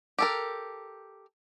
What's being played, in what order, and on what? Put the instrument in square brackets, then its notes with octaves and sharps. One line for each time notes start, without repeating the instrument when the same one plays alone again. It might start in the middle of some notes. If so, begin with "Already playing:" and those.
[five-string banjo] G4 A4 A#4